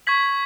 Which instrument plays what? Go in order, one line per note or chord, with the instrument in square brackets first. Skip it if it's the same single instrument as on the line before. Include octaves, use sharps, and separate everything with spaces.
[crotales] C#6 G#6 B6 F#7